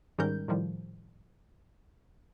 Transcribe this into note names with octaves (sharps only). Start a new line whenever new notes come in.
G#2 D#3 G3 C#4 A#4 G6
A2 D#3 F3 G3